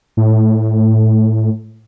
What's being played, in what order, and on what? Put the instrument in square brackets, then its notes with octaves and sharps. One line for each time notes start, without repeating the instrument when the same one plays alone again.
[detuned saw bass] A2